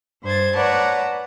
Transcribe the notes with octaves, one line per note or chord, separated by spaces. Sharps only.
G2 C5 G#6 A6
B4 C#5 D5 F#5 A5 A#5